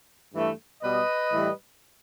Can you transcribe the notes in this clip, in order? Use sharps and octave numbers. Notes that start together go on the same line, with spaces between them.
G2 E3 A3
B2 G3 B4 D#5
A2 E3 G3